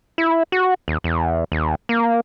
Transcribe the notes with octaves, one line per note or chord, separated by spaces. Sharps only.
E4
F#4
D#2
E2
D#2
A#3